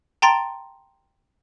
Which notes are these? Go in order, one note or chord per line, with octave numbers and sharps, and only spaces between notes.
G5 A5 A#5 C6 A6 D7